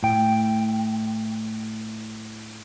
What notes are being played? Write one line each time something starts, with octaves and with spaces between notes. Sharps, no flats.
A2 G5